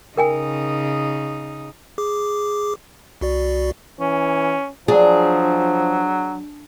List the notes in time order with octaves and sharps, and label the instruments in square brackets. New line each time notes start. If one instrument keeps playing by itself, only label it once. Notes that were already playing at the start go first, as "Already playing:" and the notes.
[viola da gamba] C#3 D#4 [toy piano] A#4 G5 G#5
[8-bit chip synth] G#4 D6
C2 F#4 D5
[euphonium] E3 [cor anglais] C#4
[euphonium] F3 [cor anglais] F#3 [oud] D4 [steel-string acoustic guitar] G#4